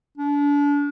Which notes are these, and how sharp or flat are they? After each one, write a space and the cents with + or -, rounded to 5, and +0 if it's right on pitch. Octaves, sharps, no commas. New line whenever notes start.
D4 -35